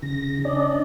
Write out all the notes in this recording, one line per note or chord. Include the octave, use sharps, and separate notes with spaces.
C#3 A#6
C#4 D4 D5 D#5